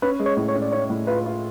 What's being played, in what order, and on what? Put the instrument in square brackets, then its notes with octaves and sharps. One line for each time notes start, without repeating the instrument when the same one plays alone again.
[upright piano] C#4 [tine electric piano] B4
[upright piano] G#3
[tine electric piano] C#5
[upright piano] A2
[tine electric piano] C#5
[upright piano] C#4
[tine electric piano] D5
[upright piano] C#4 [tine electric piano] C#5
[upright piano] A2
[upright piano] F4 [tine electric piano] B4
[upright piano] F4